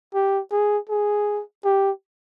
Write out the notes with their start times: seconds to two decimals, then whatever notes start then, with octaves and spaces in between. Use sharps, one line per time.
0.14 G4
0.52 G#4
0.90 G#4
1.65 G4